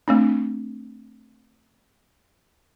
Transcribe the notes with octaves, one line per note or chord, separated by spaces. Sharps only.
A3 C4 D4